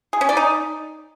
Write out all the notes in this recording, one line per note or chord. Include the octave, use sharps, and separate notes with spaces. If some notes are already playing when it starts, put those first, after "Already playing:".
G#4
C#4
D5
D#4